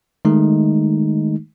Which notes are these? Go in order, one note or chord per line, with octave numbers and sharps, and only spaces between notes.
D#3 G#3 A3 D#4